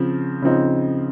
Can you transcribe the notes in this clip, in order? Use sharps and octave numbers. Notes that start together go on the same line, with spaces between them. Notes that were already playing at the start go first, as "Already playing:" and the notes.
Already playing: C#3 F3 C4
C#3 F3 C4 D#4